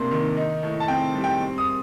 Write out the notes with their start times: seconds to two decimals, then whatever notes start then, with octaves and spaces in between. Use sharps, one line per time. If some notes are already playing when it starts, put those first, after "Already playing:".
Already playing: C3 A#3 D4 C6
0.11 D#3
0.37 D#4
0.63 A2
0.80 A5
0.88 C4 G5
1.15 G3
1.24 G5
1.41 C4
1.58 D#6